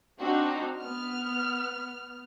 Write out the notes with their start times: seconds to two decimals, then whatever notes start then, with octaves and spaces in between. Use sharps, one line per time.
0.20 C4 D4 D#4 F#4
0.79 B3 F6